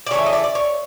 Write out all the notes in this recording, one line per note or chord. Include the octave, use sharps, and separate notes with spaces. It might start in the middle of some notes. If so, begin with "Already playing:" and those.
D5
C#3 E3 A3 C#5
D#5
D5
D5
C#5